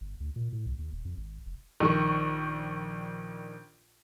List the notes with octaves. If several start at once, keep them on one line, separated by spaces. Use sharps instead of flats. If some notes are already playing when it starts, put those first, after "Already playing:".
G1
D2
A#2
A2
C2
D#2
D#1
F2
G#1
F1
A#1 D#3 C#6